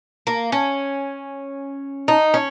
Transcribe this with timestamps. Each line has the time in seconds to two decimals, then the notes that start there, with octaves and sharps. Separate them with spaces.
0.27 A#3
0.52 C#4
2.08 D#4
2.34 C#4